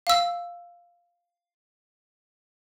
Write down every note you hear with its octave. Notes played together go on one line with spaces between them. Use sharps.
F5 E6